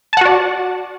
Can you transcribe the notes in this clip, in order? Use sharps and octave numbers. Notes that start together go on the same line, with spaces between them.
F#4 D5 F#5 A5